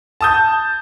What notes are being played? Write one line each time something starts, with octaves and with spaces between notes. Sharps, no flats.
A5 D#6 G6